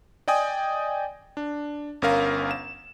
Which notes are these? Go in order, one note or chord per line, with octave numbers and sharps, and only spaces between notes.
D5 D#5 G5 G#5 D#6
D4
G1 C#4 A#4 F5
E7